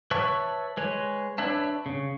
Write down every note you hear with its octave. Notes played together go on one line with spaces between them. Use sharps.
B4 C#5 E5 A5 C#6
G#3 B4 C#5
D4 B4 C#5 E5 A5
C#3